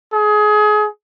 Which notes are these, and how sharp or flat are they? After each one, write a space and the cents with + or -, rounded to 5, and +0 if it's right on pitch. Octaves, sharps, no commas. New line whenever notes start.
G#4 +25